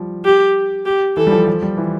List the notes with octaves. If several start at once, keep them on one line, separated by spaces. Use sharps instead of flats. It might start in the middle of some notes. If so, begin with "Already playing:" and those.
Already playing: F3 G3
G4
G4
E3 A4
G3
F3
F3
G3
E3